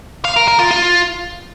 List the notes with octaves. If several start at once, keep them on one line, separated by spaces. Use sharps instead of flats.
F5
A#4
A#4
F4
F4